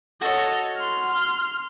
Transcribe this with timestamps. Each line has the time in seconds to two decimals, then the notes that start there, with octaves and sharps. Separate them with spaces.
0.22 F#4 A4 C#5 D#5
0.77 C6 F6